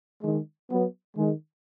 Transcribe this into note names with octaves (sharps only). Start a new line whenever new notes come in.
D#3 G#3
F#3 B3
D#3 G#3